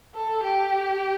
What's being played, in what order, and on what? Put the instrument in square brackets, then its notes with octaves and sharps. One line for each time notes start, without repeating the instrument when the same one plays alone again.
[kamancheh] A4
G4